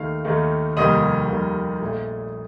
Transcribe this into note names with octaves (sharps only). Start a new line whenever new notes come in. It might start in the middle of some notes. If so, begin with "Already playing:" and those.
Already playing: D#2 D#3 A3 D#4 F5
D#2 D#3 A3 D#4
F1 D#2 D#3 G3 A#3 D#5 D#6
F1 D#2 D#3 G3 A#3
A#1 A#2 A3